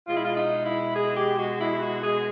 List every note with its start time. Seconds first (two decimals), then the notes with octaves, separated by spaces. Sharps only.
0.07 B2 G#3 F4
0.16 E4
0.24 F4
0.37 D#4
0.65 E4
0.94 G#4
1.16 G4
1.38 F#4
1.59 E4
1.81 F#4
2.03 G#4